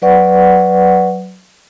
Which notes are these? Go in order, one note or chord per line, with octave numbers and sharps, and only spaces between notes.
F#3 B4 D5 F#5 C#6